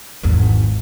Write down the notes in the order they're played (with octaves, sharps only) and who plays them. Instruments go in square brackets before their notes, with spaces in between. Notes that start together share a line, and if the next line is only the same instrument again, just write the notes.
[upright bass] G#1 E2